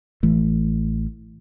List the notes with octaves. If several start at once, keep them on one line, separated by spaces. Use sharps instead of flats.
A1 E3 A3